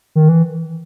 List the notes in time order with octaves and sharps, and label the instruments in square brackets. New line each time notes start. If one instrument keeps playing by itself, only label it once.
[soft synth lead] D#3
E3